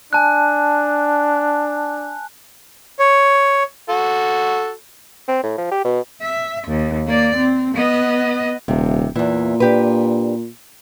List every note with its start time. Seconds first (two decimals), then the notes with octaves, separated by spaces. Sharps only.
0.13 D4 G#5 A5 F#6
2.99 C#5
3.89 F#4 A4
5.28 C4
5.43 A2
5.57 F3
5.71 G4
5.84 B2
6.22 E5
6.68 D#2
7.06 A#3 D5
7.36 C4
7.74 B3 D#5
8.68 D#1 C3
9.16 E2 A#2 E3
9.60 D4 G4 B4